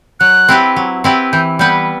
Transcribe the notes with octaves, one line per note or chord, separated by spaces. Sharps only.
F#3 F#6
C4 E4 G4 B4
F#3
C4 E4 G4 B4
E3 G6
G3 B3 E4 B4 G6